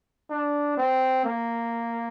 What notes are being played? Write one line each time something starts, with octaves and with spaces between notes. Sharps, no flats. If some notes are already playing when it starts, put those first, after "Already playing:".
D4
C4
A#3